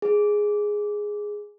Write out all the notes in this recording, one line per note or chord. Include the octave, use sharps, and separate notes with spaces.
G#4